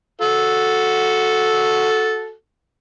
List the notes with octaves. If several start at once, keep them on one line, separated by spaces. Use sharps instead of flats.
F#4 A4